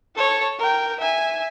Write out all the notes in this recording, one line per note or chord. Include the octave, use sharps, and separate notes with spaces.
A4 C#5
A#4 G5
E5 G#5